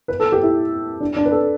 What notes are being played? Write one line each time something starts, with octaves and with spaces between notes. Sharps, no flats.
B4
A4
G4
E4
D4
D4
B4
A4